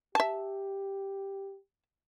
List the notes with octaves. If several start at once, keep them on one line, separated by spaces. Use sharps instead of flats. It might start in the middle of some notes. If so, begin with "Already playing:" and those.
G4 E5 A5